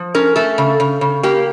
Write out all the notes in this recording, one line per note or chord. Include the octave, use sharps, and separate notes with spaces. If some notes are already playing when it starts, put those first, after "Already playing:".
Already playing: F3
C#4 A#4
A3 A4
C#3
C#3
C#3
A#3 G4